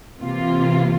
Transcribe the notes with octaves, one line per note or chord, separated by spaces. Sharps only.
C3 E3 A#3 F4